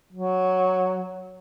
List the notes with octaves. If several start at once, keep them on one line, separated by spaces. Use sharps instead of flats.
F#3